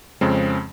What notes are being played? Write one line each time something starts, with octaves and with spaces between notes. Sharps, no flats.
F2 C#3 G#3 C4